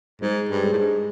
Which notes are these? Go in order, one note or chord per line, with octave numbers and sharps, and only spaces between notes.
G#2 G#3
G2
G#3
A2
G#2